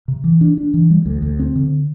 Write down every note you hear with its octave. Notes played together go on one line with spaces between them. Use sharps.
C3
E3
D4
D4
E3
G3
D2
D2
C4
D3